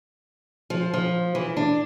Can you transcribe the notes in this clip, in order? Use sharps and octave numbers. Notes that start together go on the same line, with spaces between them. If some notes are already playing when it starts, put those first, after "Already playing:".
F3
F3
E3
D4